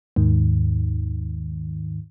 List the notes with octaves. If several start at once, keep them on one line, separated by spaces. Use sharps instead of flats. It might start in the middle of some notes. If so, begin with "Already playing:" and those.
D#2 G#2 D#3